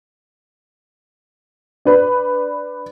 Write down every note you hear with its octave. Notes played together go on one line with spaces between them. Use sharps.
D4 B4